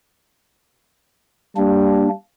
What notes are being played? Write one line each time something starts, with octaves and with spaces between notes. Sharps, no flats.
G3 A#3 D4